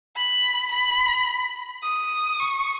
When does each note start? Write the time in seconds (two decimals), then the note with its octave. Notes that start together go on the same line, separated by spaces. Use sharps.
0.16 B5
0.72 B5
1.83 D#6
2.39 C#6